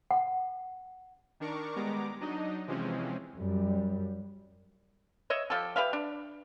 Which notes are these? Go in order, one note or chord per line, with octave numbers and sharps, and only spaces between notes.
F#5
D#3 D4 A#4 C#6 D6
G3 G#3 B3 A#5 D6
F#3 D4 D#4 D#5
C3 E3 F3 G#3 C4 C#4
F#2 G3
C#5 D#5 E5
F3 G4 A4
G4 B4 E5 F5
D4